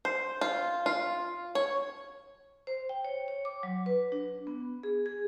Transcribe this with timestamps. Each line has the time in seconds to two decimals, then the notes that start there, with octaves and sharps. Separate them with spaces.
0.05 C5
0.41 F4
0.86 F4
1.55 C#5
2.67 C5
2.89 G5
3.05 C#5
3.28 C#5
3.45 D6
3.63 F#3
3.86 B4
4.12 D4
4.47 B3
4.83 G#4
5.06 G#4